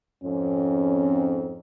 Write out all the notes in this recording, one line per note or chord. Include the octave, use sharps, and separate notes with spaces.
F2 G#2 C4 C#4